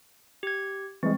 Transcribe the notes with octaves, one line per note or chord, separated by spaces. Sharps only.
G4 G#6
E3 G3 G#3 C4